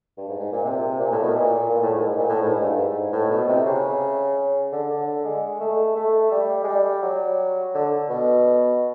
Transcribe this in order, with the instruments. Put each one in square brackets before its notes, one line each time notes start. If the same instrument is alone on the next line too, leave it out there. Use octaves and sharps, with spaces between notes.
[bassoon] G2
G#2
G#2
A#2
C3
A#2
A2
B2
A#2
A#2
A2
G#2
G#2
A#2
A2
G#2
G2
G#2
A2
B2
C3
C#3
D3
D3
G#3
A3
A3
G3
G#3
G3
F#3
D3
B2